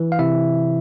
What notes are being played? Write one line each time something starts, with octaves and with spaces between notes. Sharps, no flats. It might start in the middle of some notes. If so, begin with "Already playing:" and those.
Already playing: E3
F5
C3 E4 E5